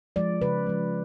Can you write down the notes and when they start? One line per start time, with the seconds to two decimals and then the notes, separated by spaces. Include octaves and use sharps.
0.16 F3 G#3 D5
0.41 C#3 B4
0.67 F3 G#3